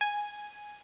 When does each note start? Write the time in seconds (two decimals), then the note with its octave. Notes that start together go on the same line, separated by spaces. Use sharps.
0.01 G#5